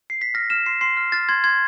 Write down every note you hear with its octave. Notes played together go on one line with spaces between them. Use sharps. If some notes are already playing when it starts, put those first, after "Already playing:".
C7
B6
F6 A#6
F6 E7
C6 C7
C6 C7
F6
F6 A6
C6 G#6
C6 G#6